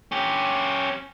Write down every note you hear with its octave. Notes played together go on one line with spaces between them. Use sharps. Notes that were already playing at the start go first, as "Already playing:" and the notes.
C#4 G4